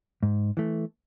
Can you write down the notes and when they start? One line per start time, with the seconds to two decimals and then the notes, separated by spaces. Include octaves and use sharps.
0.23 G#2
0.57 E3 A3